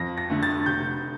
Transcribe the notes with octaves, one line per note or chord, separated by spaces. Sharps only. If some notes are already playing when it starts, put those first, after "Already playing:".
Already playing: F2 A#6
A#6
D3 A3
A6
F1 G6